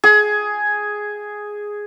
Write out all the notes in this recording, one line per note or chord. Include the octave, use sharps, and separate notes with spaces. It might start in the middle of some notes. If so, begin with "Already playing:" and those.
G#4